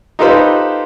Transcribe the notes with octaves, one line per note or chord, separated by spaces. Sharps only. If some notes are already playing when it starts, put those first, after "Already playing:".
D#4 F4 G4 A4 B4 C5